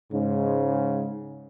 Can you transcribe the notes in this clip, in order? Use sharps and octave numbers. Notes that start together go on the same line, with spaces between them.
G#2 C#3